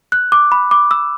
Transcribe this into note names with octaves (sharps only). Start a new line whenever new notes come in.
F#6
D6
B5
D6
E6